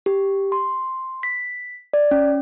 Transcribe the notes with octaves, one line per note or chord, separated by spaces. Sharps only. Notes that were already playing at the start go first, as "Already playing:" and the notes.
G4
C6
B6
D5
C#4